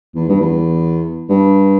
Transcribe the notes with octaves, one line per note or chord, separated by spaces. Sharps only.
E2
G2
E2
G2